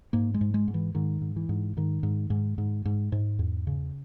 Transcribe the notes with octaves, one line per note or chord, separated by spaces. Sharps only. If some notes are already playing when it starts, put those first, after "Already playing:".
G#2 A#3
G#3
G#2
G#3
G#2
E3
G#2 D#3
G#2
E3
G#2
G#2 D#3
G#2
G#2
G#2
G#2
G#2
E2
C#3